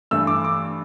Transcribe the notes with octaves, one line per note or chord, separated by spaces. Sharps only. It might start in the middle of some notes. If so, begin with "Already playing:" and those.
G2 E3 A3 E6
D6
D6